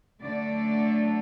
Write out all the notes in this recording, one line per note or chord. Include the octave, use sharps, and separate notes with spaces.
D3 F#3 A3 D4 D5